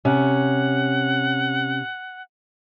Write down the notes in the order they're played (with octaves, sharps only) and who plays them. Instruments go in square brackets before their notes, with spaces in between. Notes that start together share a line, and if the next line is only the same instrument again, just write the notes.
[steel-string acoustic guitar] C3 C#4 [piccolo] F#5